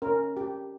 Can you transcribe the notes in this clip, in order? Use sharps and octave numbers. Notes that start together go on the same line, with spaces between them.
C#4 A#4
G4